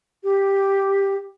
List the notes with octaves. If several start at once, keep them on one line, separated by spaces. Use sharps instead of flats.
G4